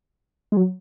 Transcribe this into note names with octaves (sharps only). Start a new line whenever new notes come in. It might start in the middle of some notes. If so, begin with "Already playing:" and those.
G#3
F#3